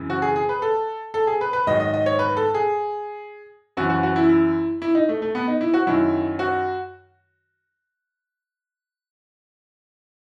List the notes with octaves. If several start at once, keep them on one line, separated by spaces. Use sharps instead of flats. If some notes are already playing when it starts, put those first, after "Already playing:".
Already playing: F#2 C#3 E3
F#4
G#4
G#4
B4
A4
A4
G#4
B4
B4
G#2 D#3 F#3 D#5
D#5
D#5
C#5
B4
A4
G#4
F#2 E3 F#4
F#4
F#4
E4
E4
E4
D#4
A3
A3
B3
D#4
E4
F#4
F#2 D#3 F#3 E4
F#4